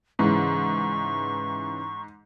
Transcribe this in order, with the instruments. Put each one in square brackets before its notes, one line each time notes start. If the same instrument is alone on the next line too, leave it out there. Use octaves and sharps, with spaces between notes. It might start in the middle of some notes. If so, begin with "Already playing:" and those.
[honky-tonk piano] G#2 [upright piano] C#3 E3 [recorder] C#6